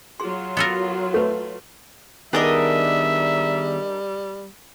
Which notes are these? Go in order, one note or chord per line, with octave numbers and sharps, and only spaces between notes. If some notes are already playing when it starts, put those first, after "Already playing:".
F#3 F4 F#4 G#4 C6
B3 A4 A#4
A3 B4 C#5
D#3 G3 B3 D4 G#4 A#4 D#5 E5